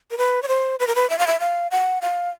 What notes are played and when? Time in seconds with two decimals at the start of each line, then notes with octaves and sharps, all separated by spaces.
0.11 A#4
0.18 B4
0.43 C#5
0.48 C5
0.80 B4
0.87 A#4
0.95 B4
1.10 E5
1.18 F5
1.27 E5
1.40 F5
1.71 F#5
2.02 F5